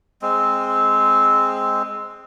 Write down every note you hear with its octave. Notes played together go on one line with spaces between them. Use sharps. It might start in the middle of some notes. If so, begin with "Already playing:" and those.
G#3 C4